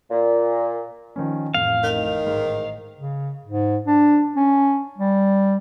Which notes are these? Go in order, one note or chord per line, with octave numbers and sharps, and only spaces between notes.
A#2
D#3 F3 C#4
A1 F2 F5
D#3
G#2
C#3
G#2
D4
C#4
G3